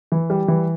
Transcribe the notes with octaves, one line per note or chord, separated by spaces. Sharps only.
E3
G3
E3